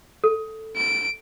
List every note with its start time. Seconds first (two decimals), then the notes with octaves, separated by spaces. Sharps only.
0.24 A4
0.77 D7